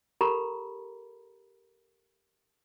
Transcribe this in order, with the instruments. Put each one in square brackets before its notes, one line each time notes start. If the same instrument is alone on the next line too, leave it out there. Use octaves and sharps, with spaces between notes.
[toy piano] G4 A4 A#4 A#5 B5